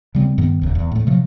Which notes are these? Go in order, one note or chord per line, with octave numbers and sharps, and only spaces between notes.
C#3 G3 C4
G2 D#3 B3
D1 C#2
E2
A2 A3
C3 F3 F#3